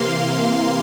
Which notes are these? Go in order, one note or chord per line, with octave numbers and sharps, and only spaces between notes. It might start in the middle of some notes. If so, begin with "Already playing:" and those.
Already playing: C3 E3 A#3 F5 C6